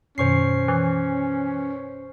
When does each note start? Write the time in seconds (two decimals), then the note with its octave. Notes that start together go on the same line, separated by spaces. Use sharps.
0.18 F#2 B2 D#3 C#4 C5 C#6 C7
0.68 E3